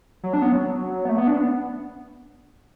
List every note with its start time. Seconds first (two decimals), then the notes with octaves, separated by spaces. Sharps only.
0.23 F#3
0.33 D4
0.42 B3
0.52 F#3
1.05 B3
1.09 A3
1.18 B3
1.27 D4
1.37 B3